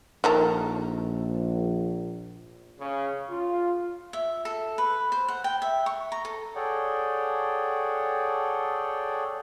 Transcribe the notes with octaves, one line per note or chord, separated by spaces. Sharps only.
A#1 D#3 A4 A#5
C#3
F4
E5
A4
B4
C5
F#5
G5
E5
C#6
A#5
A4
G#4 A4 C#5 D5 F#5 G5